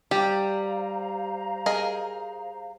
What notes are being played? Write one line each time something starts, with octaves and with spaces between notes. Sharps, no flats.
G3 G4 C5 F5 A#5
G#4 A#4 D#5